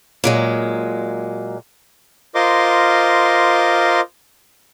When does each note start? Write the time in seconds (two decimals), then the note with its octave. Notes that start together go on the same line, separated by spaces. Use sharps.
0.24 A#2 F#3 G#3
2.35 F4 A#4 C5 D#5 C6 D6